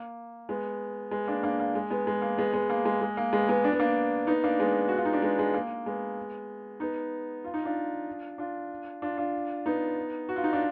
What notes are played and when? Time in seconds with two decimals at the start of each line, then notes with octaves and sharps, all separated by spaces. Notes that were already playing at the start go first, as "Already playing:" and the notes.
Already playing: A#3
0.49 G#3 B3
1.11 G#3 B3
1.27 A#3 D4
1.43 A#3 D4
1.60 A#3
1.75 G#3
1.91 G#3 B3
2.07 G#3
2.22 A#3
2.38 G#3 B3
2.53 G#3 B3
2.70 A#3
2.85 G#3
3.01 G#3
3.17 A#3
3.33 G#3 B3
3.49 G#3 B3
3.64 D4
3.72 B3
3.79 A#3 D4
4.27 B3 D#4
4.44 A#3 D4
4.59 G#3 B3
4.88 F#4
4.97 F4
5.05 D#4
5.13 D4
5.22 G#3 B3
5.39 G#3
5.54 A#3
5.86 G#3 B3
6.80 B3 D#4
7.44 F4
7.54 D#4
7.65 D4 F4
8.38 D4 F4
9.02 D4 F4
9.18 D4 F4
9.66 B3 D#4
10.29 F#4
10.36 F4
10.44 D#4
10.53 D4 F4